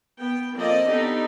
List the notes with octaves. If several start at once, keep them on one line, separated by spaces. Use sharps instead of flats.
B3 G5
F3 A#3 C4 A4 D5 D#5
B3 D4 D#4 G4 A4